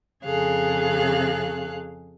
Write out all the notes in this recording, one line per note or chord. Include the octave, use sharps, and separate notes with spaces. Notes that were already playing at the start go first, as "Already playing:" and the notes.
F2 C#3 G#4 A4 F5 F#6